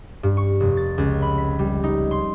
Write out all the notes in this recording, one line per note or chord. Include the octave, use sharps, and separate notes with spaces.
G2
C#6
F1
A6
C#2
B5
B6
G3
D#4
C6